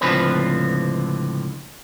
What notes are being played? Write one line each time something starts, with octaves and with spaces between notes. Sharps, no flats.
C#2 A2 D3 F3 C4 B4